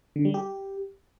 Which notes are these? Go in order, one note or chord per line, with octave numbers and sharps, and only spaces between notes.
D3
G3
G4